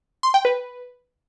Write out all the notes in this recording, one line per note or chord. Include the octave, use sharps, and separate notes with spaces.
C6
G5
B4